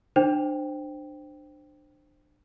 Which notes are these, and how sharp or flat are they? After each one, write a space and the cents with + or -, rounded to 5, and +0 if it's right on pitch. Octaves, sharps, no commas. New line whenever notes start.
D4 +25 C5 +0 G5 +0